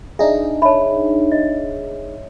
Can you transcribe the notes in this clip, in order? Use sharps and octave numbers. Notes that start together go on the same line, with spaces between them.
D4 D#4 G#4 E5
C#5 E5 A5 B5
D#5